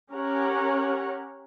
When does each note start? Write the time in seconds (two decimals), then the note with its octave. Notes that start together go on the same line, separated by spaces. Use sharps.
0.12 C#4 G4 A#4 C#5 F#5